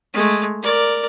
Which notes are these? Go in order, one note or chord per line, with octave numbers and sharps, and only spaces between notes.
G#3 A3
A#4 D5